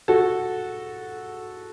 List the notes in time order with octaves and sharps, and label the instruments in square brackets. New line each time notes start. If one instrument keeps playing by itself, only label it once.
[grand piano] F#4 A4